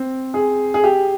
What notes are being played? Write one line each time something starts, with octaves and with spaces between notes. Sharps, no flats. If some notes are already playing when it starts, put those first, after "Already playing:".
Already playing: C4
G#4
G#4
G4